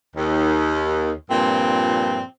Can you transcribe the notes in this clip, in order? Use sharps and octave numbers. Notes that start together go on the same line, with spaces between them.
D#2
G2 A#2 F3 C4